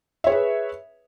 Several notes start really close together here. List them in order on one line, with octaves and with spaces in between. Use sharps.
E5 C#5 G#4 B4